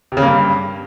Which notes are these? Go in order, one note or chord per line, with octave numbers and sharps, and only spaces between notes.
C3
C#3
A#3
G2